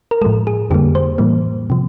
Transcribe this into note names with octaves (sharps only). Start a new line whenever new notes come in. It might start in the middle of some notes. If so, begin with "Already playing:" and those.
A#4
A2 F3 G#3 A4
G#4
F2 D3 G3 A#3 G4
C5
A2 E3 G3 A#3
C3 F3